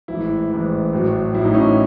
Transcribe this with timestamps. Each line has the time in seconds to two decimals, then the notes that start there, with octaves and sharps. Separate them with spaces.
0.08 A1 G#2 E3 E4
0.50 A1 G#2 E3
0.93 A1 A2 F#3
1.34 A1 A2 F#3 E4
1.45 D#4
1.54 C#4
1.63 D#4